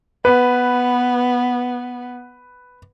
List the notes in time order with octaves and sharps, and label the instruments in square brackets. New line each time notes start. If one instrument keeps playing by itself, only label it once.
[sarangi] B3 [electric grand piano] B4